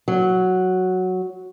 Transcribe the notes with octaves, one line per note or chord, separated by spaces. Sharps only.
F#3